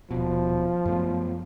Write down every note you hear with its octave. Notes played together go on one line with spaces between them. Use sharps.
D#1 B2 F3
F#2 A3 B3